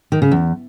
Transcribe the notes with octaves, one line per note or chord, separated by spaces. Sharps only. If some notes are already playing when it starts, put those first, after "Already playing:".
D#3
C#3
E2